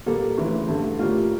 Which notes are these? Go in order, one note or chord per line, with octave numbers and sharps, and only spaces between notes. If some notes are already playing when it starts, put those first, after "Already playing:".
A#2 G3 A#3 A4
D2 C#3 E3
G2 D3 A3
A2 G3 A#3 F4